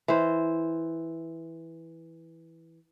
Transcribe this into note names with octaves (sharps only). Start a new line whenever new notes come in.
E3 C5